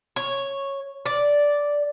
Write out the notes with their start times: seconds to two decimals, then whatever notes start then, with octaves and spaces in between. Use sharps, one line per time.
0.16 C#5
1.06 D5